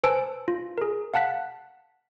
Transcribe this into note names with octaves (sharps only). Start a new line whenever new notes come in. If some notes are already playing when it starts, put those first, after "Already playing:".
B4 C5 G#5 A5 E6 D7
F4
G#4 A#4
F5 F#5 A5 F#6 B6